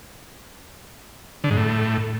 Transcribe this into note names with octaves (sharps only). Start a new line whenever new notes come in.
D3
G#2
A2